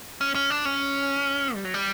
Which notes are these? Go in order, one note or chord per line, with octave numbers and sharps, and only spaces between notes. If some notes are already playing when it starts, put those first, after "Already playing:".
C#4
C#4
D4
C#4
G3
F#3
G3